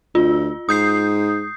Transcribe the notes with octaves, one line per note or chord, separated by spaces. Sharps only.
D2 F4
G#2 D#6 G6 C7